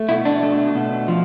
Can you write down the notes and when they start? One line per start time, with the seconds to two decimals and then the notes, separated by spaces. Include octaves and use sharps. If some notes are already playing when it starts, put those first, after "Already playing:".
Already playing: A3
0.09 B2 E4
0.25 D4
0.43 A3
0.75 B2
1.08 F3